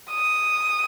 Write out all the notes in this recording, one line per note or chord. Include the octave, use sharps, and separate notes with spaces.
D#6